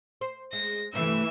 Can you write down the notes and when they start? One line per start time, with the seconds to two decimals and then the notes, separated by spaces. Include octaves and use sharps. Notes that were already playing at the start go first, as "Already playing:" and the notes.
0.21 C5
0.53 G#3 A#6
0.93 G2 C3 E3 A3 E5